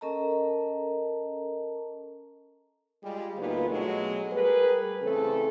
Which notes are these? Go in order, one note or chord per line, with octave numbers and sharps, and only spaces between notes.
C#4 A4 A#4 D#5 A5 A#5
G3 G#3 F4 G4
D2 A#2 B3 D#4 F4 B4
B2 F#3 G#3 A3
G3 G#4 A#4 B4
C#3 E3 A3 C4 A4